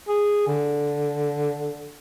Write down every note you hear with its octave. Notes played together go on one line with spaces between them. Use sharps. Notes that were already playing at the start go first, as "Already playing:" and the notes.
G#4
D3